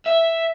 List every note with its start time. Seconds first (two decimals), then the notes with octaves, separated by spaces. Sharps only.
0.06 E5